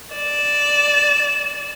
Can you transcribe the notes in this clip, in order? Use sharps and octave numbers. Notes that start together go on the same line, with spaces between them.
D5 E7